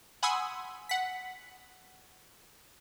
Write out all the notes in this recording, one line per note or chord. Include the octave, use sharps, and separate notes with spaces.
F#5 G#5 B5 C6 D#6 E6
F#5 B6